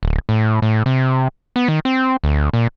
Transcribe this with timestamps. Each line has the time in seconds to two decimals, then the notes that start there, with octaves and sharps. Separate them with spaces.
0.03 D1
0.29 A2
0.62 A2
0.86 C3
1.56 B3
1.68 D#3
1.85 C4
2.24 D2
2.53 A#2